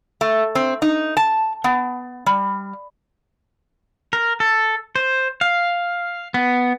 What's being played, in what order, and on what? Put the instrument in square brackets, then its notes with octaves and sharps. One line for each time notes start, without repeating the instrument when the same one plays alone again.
[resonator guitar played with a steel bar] A3
C4
D#4
A5
B3
G3
[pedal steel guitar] A#4
A4
C5
F5
B3